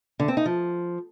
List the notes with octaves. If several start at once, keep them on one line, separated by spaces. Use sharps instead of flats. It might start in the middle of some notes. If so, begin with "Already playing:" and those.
D3
C4
D#4
F3